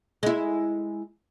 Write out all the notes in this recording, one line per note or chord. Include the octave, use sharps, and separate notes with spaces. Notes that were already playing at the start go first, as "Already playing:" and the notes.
G#3 E4